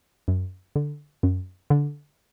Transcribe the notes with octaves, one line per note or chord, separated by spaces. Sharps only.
F#2
D3
F#2
D3